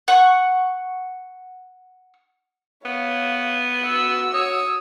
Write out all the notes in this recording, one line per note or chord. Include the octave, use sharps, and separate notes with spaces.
F#5 C#6
B3 C#5 F5
F#4 E6
C#5 D#6